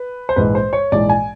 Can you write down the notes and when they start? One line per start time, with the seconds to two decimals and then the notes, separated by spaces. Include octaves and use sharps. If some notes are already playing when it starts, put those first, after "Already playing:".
Already playing: B4
0.29 C5
0.36 A#1 G#2 E3 G#3 B4
0.55 C5
0.73 C#5
0.92 A#1 G#2 E3 G#3 D5
1.09 G#5